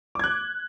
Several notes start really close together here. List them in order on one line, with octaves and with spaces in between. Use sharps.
D6 G#6 F#6